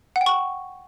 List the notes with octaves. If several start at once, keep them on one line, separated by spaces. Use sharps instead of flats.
F#5
G5
C#6